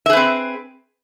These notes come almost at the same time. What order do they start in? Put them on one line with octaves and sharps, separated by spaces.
E5 G#4 B4 C4